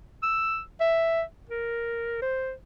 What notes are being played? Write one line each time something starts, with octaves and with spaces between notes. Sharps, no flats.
E6
E5
A#4
C5